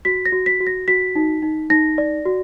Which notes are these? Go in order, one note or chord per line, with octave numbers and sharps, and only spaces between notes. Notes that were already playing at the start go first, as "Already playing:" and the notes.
F#4 B6
A#6
F#4
B6
F#4
A#6
F#4 B6
D#4
D#4
D#4 A#6
D5
F#4